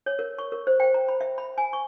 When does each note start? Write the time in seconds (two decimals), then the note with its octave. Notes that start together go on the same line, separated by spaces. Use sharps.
0.06 C#5
0.19 A#4
0.38 C#6
0.52 A#4
0.67 C5
0.80 G5
0.94 A#5
1.08 B5
1.21 E5
1.38 B5
1.58 G#5
1.73 C#6